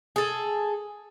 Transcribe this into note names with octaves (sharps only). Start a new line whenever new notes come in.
G#4 A4